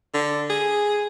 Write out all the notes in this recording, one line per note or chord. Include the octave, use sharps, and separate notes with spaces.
D3
G#4